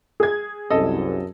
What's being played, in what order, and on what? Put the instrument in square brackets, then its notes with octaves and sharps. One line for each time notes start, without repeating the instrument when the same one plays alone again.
[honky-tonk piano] G#4 G#6
[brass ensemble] C2 F#2 [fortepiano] A4 D#5